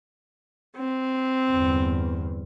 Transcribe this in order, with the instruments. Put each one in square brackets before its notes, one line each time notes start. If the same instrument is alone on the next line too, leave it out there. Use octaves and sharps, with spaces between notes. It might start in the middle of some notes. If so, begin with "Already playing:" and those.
[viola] C4
[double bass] G1 E2